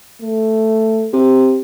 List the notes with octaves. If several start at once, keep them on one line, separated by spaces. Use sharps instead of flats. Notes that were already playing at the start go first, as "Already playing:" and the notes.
A3
C3